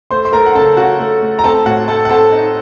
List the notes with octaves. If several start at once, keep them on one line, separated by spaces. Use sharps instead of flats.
A3 C5 C6
C6
A3 A#4 A#5
F#5
C#3 A4 A5
C#3 F#4 F#5
A3
A3
A#5
C4 A4 A5
A2 F#4 F#5
A3 A4 A5
F#5
C4 A4 A5
D#4